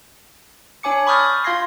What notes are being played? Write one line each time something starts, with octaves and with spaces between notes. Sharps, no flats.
D4 C#5 G#5 D6 C#7
B5 C#6 D#6 F6 G6 A6
F4 F5 C6 G#6 A#6 C7